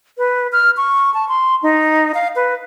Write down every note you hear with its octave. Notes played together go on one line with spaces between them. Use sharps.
B4
F6
C#6
A5
C6
D#4
F5
B4